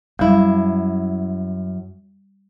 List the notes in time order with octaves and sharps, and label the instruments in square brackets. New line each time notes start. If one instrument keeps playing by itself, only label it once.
[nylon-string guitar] F#2 E4 [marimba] G3